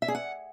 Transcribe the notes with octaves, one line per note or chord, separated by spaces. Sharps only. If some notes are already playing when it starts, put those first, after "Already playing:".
E5
G#4
F#5